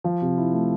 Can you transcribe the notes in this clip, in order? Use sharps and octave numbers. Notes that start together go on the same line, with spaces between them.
F3
C3
E4
A3